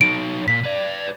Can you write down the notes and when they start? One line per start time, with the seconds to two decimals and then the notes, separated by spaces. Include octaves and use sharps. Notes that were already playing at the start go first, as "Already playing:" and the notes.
0.01 F#3 D#4 D7
0.48 A#2 B6
0.63 B4 D5